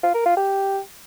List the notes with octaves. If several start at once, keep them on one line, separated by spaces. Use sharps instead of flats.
F4
A#4
F4
G4